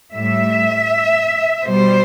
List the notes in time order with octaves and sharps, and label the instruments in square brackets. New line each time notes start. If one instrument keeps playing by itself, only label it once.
[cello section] A2 G3 E5
B2 G3 C5